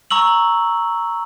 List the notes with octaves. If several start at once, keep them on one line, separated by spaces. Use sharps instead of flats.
A#5 C#6 E6 F#7